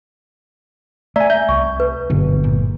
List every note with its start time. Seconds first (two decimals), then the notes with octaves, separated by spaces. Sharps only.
1.16 A3 D5 E5 G#5 A#5
1.30 E5 G6
1.49 C2 C#6
1.80 B4
2.10 G1 G#2 B2 F#3
2.44 A#2